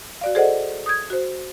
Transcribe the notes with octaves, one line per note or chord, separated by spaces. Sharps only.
F#4 D5 F5
G#4 A4 C5 D5 D#5 F#5
D#6 G6 G#6
F#4 C5